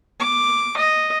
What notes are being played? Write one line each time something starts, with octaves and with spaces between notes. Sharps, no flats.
D6
D#5